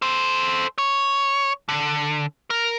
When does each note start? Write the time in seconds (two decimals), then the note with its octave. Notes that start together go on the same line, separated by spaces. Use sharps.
0.02 A4 C5
0.78 C#5
1.69 D3
2.50 A#4